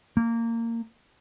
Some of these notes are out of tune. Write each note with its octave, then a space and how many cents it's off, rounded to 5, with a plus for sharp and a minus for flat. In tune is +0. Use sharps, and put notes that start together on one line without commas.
A#3 -20